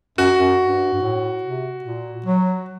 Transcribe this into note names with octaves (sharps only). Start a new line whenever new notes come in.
F#2 F#4
F#2
G2
G2
A2
C3
A#2
F#3